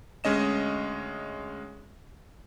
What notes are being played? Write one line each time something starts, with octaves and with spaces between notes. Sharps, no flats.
D2 G#3 C#4 D#5 E7